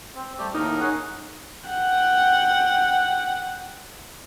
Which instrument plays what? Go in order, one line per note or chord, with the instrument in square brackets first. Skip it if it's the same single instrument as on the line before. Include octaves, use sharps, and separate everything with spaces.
[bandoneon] C4
G3 A3 G4
[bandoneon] D#2 A2 A#4 [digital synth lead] D#4
[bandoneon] C#4 G#4 F#5
[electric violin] F#5 G5